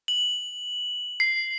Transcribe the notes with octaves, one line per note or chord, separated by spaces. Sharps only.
F#7
C7